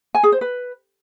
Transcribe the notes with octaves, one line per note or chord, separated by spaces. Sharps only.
G#5
G#4
C5
B4